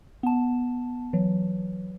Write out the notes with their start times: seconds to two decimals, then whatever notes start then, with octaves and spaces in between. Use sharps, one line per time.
0.23 B3 A5
1.13 E3 F#3